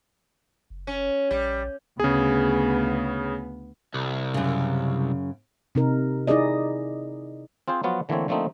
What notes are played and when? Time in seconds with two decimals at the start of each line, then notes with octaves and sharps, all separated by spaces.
0.70 F#1
0.87 C#4
1.31 A#1 G3
2.00 D2 C#3 B3 G#4
3.94 C2
4.34 F#2 C#3
5.75 C3 D#4 A#4
6.27 D#4 E4 G#4 D5 D#5
7.68 C4 F4 G#4 C5
7.83 F3 F#3 B3 F4 F#4
8.09 D3 E3 A3 A#3 C4 C#5
8.28 D3 F3 A3 A#3 C4 D#4